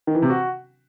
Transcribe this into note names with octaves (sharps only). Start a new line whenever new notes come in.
D#3
E3
C3
F#4